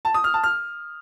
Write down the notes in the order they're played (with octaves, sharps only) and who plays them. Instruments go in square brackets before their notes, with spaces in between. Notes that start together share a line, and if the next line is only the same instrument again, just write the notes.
[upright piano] A5
D#6
F6
A5
F6